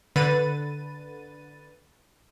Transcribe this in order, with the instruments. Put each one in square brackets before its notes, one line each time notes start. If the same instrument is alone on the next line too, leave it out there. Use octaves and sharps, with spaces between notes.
[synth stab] D3 B4 A6 D#7